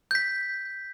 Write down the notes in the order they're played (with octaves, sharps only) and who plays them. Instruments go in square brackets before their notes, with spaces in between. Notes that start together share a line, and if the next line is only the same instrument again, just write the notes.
[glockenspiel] G6 B6